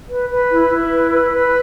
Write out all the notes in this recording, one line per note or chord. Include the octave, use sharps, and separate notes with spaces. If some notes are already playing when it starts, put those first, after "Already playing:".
B4
B4
E4
E4
B4
B4
B4